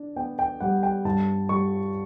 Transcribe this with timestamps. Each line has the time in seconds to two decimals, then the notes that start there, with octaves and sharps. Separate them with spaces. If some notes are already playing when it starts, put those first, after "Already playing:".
Already playing: D4
0.16 B3 G5
0.39 G5
0.60 G3 F#5
0.83 G5
1.05 G2 A5
1.49 G3 C#6